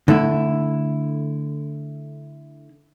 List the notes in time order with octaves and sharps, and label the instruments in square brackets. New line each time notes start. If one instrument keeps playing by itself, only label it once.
[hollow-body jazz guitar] D3 A3 E4